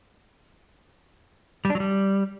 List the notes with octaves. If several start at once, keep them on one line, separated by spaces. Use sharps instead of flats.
G3
D4
F#3
G3